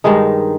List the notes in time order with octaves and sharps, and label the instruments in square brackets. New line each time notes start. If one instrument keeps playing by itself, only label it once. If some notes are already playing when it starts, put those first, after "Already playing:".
[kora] G2 D#3 G#3 D#4